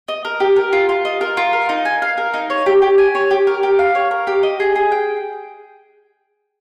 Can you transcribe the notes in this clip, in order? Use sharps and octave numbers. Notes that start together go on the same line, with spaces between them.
D#5
A#4
G4
A#4
F4
F4
D#5
A#4
F4
A#4
D#4
G#5
F5
A#4
D#4
C#5
G4
G4
G#5
C#5
G4
A#4
G4
F5
C#5
A#4
G4
D#5
G#4
G#4
G5